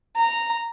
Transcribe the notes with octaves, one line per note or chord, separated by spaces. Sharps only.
A#5